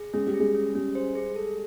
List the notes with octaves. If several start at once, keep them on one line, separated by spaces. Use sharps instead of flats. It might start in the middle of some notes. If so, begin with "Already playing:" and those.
Already playing: G#4
G#3 C#4
G3
G#4
G#3
C#4
G3 C#4
C5
G#4
A4